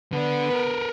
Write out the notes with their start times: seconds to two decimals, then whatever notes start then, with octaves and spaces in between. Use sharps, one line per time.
0.13 D3 B3 D4
0.51 A#4 B4